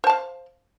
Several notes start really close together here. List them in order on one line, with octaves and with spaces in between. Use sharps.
C5 A5 F5